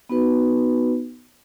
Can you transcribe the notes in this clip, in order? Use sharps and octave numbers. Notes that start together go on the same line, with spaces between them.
B3 D#4 F#4 B4